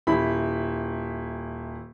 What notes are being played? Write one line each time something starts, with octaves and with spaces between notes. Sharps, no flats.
D#1 E4 B5